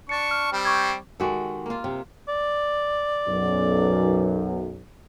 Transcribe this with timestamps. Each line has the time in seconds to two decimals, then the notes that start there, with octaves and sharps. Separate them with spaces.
0.09 D4 C#6 A6 C#7
0.31 F6
0.52 G3 C4
0.65 C#6 D6 G#6
1.20 D#3 G#3 F#4 G4 A4
1.66 A#3 F4
1.84 C3
2.29 D5
3.27 B1 F#2